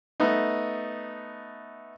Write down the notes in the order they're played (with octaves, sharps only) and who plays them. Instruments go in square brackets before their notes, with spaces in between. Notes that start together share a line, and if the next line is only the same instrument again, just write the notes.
[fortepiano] A3 B3 D#4